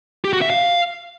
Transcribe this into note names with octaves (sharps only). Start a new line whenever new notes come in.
G4
F#4
E5
F5